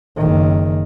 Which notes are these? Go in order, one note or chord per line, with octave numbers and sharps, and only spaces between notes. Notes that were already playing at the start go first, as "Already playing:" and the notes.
F#1 D#3